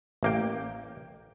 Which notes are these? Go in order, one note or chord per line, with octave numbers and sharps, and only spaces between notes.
A1 A#3 G5